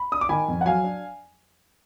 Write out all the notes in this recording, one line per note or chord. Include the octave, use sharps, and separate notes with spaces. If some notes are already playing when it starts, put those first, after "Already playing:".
Already playing: B5
D4 D#6
D6
D#3 G#5 B5
F2
F#5
F#3 F5 G#5
D4